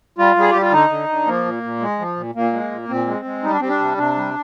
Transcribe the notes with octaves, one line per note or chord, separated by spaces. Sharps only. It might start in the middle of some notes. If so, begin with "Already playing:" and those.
G3 F4
G3 G#4
G3 G4
F4
D3 D#4
D3
D3
F3 A#3
A#2
A#2
G#3
F3
A#2
A#2 A#3
G#3
A#2
A#2 C4
G#3
G#3
G3 D#4
D4
G3 C4
D4
C3
C3 D4
G3